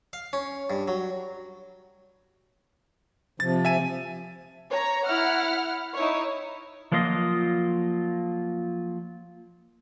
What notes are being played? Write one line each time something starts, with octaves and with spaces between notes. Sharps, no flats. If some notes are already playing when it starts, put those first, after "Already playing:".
F5
C#4
G2
F#3
C3 F3 A6
E5 G#5 D#7
C#5 A#5
E4 F#5 F6
D#4 E4 C#5
F3 F#3 A#3 F4 D#5